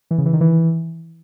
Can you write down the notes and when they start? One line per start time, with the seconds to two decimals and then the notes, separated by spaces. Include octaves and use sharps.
0.11 E3
0.18 C#3
0.26 E3
0.33 D#3
0.41 E3